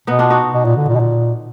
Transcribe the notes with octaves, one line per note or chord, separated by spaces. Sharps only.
B2 B3 D#4
D4 F4
D#4 F#4
B2
A#2
D3
A#2
B2
A#2